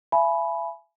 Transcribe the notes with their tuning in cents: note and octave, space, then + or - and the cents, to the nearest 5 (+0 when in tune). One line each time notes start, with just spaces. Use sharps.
E5 +35 G#5 +25 B5 +0